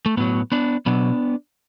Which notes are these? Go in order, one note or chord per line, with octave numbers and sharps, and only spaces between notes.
A3
A2 F#3 B3
B3 D4
B2 F#3 B3 D4